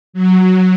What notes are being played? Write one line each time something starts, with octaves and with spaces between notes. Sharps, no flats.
F#3